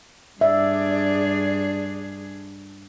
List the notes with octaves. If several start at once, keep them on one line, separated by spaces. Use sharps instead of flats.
G2 D4 G#4 D5 E5